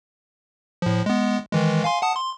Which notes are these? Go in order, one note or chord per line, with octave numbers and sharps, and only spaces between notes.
A2 F3
G#3 B3
D#3 E3 G#3
F5 G#5 C6
F#5 A5 D#6
C6